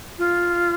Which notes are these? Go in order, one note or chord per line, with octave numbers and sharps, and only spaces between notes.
F4